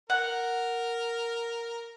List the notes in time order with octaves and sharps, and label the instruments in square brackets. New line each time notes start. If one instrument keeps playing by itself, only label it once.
[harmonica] A#4 [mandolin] F#5